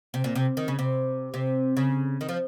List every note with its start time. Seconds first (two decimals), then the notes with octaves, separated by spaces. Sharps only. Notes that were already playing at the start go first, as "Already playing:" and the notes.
0.14 C3
0.24 A#2
0.35 C3
0.57 D#3
0.68 C#3
0.79 C3
1.34 C3
1.77 C#3
2.21 D#3
2.29 F3